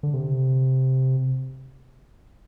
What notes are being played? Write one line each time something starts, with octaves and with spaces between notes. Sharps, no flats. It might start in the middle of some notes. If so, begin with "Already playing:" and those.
D3
C3